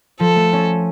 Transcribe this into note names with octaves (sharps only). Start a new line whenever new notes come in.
F3 A4
A3
C#4